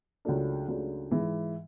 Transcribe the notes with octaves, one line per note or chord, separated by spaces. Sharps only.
C#2 C#3 F#3 A3 D4
C#2 C#3 F#3 A3 D4
G#2 E3 G#3